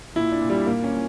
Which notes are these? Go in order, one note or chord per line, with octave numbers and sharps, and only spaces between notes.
A#2 E4
D4
A#2
G3
A#2 A#3
C#4
A#2